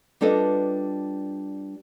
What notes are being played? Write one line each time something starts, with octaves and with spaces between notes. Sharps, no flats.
G3 D4 F4 A4 B4 D#5